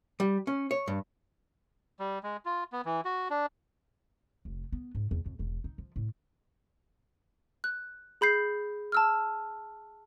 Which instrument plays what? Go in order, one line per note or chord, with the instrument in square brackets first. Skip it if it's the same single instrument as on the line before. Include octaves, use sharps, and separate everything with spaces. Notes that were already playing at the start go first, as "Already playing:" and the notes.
[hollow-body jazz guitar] G3
C#4
C#5
G2
[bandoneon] G3
G#3
F4
B3
E3
F#4
D4
[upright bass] F1
B3
G#2
E2
F2
E1
D#4
F3
A2
[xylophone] F#6
G#4 B5 G6 C7
A5 E6 F6